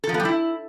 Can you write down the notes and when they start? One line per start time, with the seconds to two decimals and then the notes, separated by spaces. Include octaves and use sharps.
0.04 A4
0.09 F3
0.14 B3
0.20 G3
0.25 E4